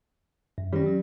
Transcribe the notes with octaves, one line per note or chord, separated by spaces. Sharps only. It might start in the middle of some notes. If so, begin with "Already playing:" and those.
F#2
D#3 G3 C#4
F#3 C#4